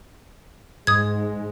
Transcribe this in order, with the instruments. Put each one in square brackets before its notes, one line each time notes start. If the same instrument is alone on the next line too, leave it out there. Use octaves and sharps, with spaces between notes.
[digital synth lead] G#2 [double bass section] G#3 [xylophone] D#6 G#6